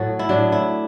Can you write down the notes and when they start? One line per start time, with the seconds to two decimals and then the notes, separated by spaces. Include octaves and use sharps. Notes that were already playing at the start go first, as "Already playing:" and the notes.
Already playing: A2 F#3 F#4 A4
0.19 E4
0.29 A2 F#3 D4
0.52 E4